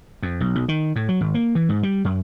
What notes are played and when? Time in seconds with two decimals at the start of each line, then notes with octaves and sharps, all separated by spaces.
0.22 F2
0.41 B1
0.55 B1
0.68 D#3
0.96 A2
1.09 F#3
1.21 G#1
1.34 A#3
1.55 E3
1.69 G#2
1.83 G3
2.05 F#2